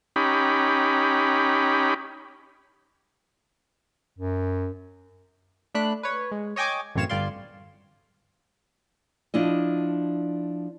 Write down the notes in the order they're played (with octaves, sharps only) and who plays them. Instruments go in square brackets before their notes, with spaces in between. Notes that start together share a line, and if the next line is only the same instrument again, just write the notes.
[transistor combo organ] C#4 D#4 G4 B5
[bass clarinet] F#2
[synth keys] A3 D4 B5 F#6
B4 C#5
G#3
C#5 D#5 G5 G#5 D6
A1 F#2 C4 C#5 F5 E7
G1 G3 F4 D5 F5 C6
[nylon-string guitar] F3 D4 E4 D#5